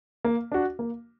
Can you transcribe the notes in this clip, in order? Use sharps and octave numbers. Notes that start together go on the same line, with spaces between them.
A#3
D4 F#4
A#3